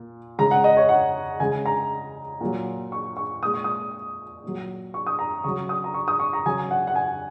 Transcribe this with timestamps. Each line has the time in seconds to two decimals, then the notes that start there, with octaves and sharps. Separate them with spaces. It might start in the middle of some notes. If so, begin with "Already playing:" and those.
Already playing: A#2
0.39 C#3 G#3 A#5
0.51 F#5
0.64 D#5
0.77 C#5
0.89 F#5
1.40 C#3 G#3 G#5
1.66 A#5
2.41 A#2 F#3
2.92 C#6
3.17 C#6
3.42 A#2 G#3 D#6
3.54 C#6
3.64 D#6
4.44 A#2 F#3
4.94 C#6
5.07 D#6
5.19 A#5
5.44 C#3 F#3 C#6
5.69 D#6
5.84 A#5
5.94 C#6
6.08 D#6
6.20 C#6
6.33 A#5
6.46 C#3 F#3 G#5
6.71 F#5
6.87 F#5
6.96 G#5